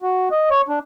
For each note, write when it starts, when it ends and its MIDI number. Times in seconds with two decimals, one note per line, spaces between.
0.02 0.29 66
0.31 0.49 75
0.51 0.61 73
0.68 0.79 62